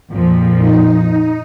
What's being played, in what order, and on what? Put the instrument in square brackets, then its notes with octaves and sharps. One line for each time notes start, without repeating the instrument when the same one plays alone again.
[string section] F2 A#2 F3
[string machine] D#4